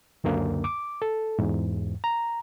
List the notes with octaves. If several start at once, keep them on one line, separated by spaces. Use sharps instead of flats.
C#2 F#2 D3 A#3
D6
A4
E2 G#2
A#5